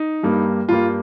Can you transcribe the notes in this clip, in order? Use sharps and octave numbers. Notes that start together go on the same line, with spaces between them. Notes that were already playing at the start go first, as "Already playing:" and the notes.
Already playing: D#4
G2 G3 A#3
G2 G3 A#3 F4